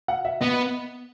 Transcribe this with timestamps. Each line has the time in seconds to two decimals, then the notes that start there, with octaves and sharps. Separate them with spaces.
0.08 F#5
0.25 E5
0.41 B3 D#5